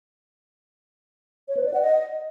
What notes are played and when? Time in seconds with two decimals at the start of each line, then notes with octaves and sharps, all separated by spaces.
1.48 C#5
1.57 B4
1.65 D5
1.74 F#5
1.82 D#5